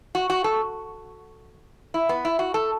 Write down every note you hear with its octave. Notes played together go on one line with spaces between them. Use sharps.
F#4
F#4
A4
E4
B3
E4
F#4
A4